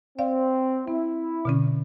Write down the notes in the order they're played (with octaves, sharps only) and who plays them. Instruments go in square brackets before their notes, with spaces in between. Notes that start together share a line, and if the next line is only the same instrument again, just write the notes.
[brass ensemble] C4 [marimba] D5 F5
[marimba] C4 [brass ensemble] E4
[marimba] B2 D3 C#4